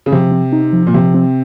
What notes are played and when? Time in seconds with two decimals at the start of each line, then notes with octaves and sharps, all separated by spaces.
0.06 C#3
0.12 C3 F3
0.32 C4
0.53 D#4
0.73 F3
0.87 A#2
0.94 C3 F3
1.15 C4